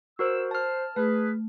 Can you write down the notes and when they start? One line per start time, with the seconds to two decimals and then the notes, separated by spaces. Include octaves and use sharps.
0.19 F#4 A#4 C5 E6
0.51 C5 A5 F6
0.96 A3 G#4 B4